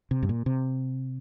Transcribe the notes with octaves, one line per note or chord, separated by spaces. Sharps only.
C3
G2
A#2
C3